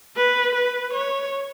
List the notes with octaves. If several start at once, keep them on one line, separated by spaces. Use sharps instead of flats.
B4
B4
C#5